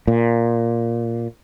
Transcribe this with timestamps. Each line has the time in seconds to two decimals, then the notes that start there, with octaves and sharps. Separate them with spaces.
0.07 A#2